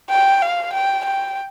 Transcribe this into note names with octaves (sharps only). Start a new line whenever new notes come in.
G5
F5
G5
G5